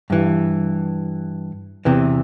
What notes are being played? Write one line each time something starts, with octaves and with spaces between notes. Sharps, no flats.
G2 E3
E2 C3 E3